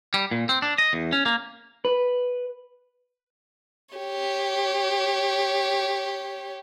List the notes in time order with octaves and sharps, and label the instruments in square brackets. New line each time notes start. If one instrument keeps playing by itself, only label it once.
[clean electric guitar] G3
A#2
C4
D4
D#5
E2
C#4
A#3
B4
[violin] G4 C#5